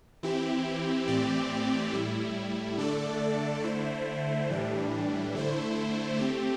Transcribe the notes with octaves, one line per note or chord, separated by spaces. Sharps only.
E3 C4 E4 G4
A2 E3 C4 G4 D5
A2 G3 E4
D3 A3 D4 A4 D5
D3 A3 E4 C5
A2 E3 G3 D4
D3 A3 E4 C5
A3 C4 G4